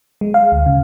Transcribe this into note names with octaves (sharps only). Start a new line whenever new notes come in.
G#3
F5
D2
C#3